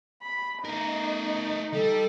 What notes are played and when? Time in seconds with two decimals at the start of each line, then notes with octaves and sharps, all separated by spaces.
0.23 B5
0.65 A3 D#4 A#4
1.73 G3 A4